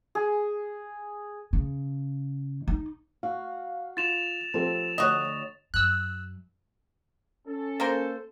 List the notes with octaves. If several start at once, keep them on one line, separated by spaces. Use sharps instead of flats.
G#4
C#3
D#4
F#4 F5
F4 A6 E7 F7
F3 C4 G4 A4
D2 F#4 C#5 D#5
F#2 E6 F#6
C#4 A4
A#3 A#4 C5